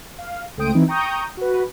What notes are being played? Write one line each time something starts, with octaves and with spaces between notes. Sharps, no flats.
F5
C#2 A3 C5 G5 D#6 D7
E3 C4 D#4 E4
G5 A#5 C#6 D#6 G6
F#4 B4